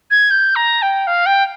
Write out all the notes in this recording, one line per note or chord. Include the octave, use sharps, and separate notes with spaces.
G#6
G6
A#5
G5
F5
G5